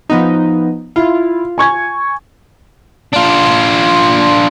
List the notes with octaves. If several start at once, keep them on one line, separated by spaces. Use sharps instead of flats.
F3 B3 D#4
E4 F4
G#5 C#6 G#6
D4 F4